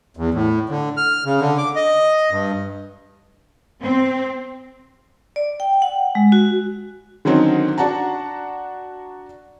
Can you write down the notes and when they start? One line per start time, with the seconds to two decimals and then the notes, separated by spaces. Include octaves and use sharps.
0.17 E2
0.34 A2
0.69 D3
0.97 F6
1.25 C#3
1.40 D3
1.58 D6
1.76 D#5
2.31 G2
3.82 C4
5.36 D5
5.60 G5
5.82 F#5
6.15 G#3
6.32 F#4
7.25 D3 D#3 F#3 C4 C#4 D#4
7.78 D4 F#4 F#5 A5 A#5